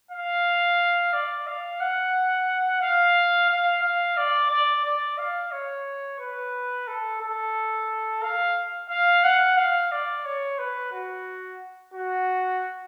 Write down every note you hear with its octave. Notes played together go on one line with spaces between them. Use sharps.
F5
D5
F5
F#5
F5
F5
F5
D5
D5
D5
F5
C#5
B4
A4
A4
F5
F5
F#5
F5
D5
C#5
B4
F#4
F#4